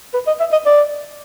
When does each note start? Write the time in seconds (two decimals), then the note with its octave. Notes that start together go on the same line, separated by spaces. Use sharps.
0.14 B4
0.27 D#5
0.40 E5
0.52 D#5
0.66 D5